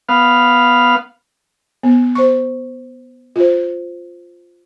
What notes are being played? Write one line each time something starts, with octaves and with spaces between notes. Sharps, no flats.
B3 F5
B3
C5 C#6
F4 C5